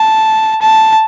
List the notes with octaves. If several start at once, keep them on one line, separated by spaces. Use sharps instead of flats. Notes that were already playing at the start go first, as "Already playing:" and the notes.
Already playing: A5
A5